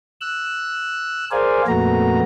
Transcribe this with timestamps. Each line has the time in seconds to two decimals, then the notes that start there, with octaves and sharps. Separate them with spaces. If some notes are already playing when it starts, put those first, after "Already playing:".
0.21 E6 F#6
1.31 G#4 A#4 C5 D5 F5 G#5
1.68 F2 A#2 A3 B3 F#4 A#5